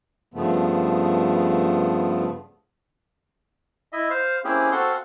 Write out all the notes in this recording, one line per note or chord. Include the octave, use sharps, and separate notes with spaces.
G2 C#3 F3 A3 B3
E4 D#5 E5
C5 F5
A#3 C4 C#4 E4 G4 G#4
C4 F#4 A4 F5 F#5 C6